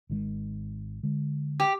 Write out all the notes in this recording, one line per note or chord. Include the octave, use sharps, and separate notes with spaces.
G#1 D#3 G#3
D3 G#3
G4